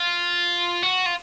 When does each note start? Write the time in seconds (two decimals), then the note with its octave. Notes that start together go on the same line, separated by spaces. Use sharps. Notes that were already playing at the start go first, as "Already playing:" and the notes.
Already playing: F4
0.83 F#4
1.06 F4